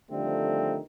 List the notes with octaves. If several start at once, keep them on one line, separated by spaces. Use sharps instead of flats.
D3 D#3 F3 G3 A3 C4